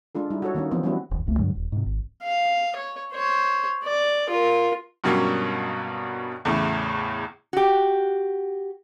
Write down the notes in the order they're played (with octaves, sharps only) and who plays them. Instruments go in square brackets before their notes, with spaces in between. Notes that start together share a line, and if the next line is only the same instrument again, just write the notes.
[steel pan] G#3 D4 F4 A4
G3 D#4 E4
F#4 A4 C#5
D#3 A#3 C#4 D#4
E3 F3 B3 C4
G3 B3 C#4 E4 F#4
[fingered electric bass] F1 D#2
F1 C#2 A3 A#3
G2 D3 F#3 G#3
D#1
G#2 C3
G#1
[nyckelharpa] F5
C#5
C5 C#5
D5
F4 A#4
[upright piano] G2 B2 F#3 G3 A#3 C#4
E2 A2 C#3 A3
[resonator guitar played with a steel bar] F#4 G4